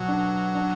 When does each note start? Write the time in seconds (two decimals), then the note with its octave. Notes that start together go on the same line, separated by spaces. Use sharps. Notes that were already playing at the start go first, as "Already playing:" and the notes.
Already playing: B2 F#3
0.08 D4
0.55 D4